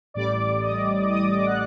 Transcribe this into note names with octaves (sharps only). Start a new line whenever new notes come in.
A1 A2 G3 D5 D6
D#5 D#6
D#5 D#6
D6
D#5 D#6
F#5 F#6